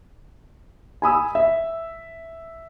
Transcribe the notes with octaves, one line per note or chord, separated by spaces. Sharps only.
G#5 B5 D#6 E6
E5